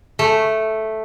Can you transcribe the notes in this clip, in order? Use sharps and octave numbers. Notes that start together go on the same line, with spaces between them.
A3